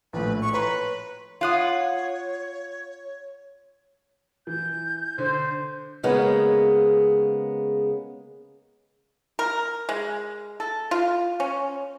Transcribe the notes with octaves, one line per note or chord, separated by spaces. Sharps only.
A#1 A2 B4
C#6
B4 C#5 A#5 C6
F4 C#5 F5 F#5 D#6
E3 G6
D3 C5
C#3 G#3 A#3 B3
A#4
G#3
A4
F4
C#4